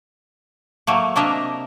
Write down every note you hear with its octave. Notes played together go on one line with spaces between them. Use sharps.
F#3 A3 A#3
C3 A#3 D4 A#4 D#5 E5